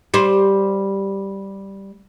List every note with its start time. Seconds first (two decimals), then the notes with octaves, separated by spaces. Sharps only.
0.14 G3 C5